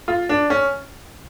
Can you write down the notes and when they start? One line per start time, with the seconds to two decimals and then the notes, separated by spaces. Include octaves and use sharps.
0.08 F4
0.29 D4
0.50 C#4